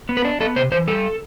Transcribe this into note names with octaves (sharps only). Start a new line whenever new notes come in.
B3
B4
D4
B3 A4
C3 C5
E3 C5
G3 A4